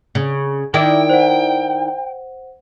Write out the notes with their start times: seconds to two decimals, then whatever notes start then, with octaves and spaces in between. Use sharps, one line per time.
0.15 C#3
0.74 D#3 E4 D5 G5
1.09 C5 F#5